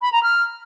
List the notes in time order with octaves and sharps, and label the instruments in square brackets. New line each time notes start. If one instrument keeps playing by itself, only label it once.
[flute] B5
A#5
F6